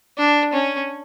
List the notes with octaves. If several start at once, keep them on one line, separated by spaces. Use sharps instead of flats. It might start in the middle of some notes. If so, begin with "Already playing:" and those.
D4
C#4